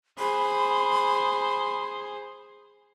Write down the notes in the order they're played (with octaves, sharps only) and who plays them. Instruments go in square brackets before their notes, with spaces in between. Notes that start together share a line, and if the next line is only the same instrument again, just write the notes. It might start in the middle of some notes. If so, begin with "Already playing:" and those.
[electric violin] G#4 C5 [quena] B5